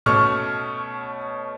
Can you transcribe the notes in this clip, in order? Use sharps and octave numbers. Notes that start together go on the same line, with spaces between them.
B2 A3 C#4 C#6 F6